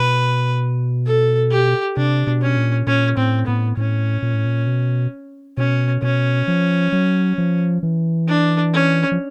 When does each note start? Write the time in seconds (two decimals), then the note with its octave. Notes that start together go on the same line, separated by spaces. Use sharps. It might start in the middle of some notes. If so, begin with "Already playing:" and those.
Already playing: B2 B4
1.06 A4
1.51 G4
1.97 C3 D4
2.27 B2
2.42 C#4
2.57 A#2
2.87 A#2 C#4
3.17 A2 C4
3.47 A2 B3
3.77 A2 C#4
4.22 A#2
4.34 A2
4.45 A#2
4.67 B2
5.57 B2 C#4
6.02 B2 C#4
6.48 F3
6.92 F#3
7.38 F3
7.83 E3
8.28 D4
8.73 C#4
9.12 F3